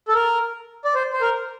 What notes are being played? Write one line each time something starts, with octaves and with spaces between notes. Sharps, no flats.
A4
A#4
D5
C5
C5
A#4